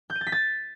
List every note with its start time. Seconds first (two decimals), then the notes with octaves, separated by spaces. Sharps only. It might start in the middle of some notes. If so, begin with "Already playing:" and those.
0.10 G6
0.15 D#7
0.21 A6
0.27 B6
0.32 A6